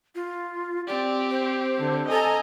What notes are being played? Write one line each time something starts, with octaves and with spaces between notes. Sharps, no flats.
F4
C4 G4 D5
C5
D3
A4 D#5 G#5 A#5